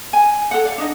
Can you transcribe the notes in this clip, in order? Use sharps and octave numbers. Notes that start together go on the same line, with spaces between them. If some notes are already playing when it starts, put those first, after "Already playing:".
G#5
A4 F#5
D5 F5
D4 D#4 D#5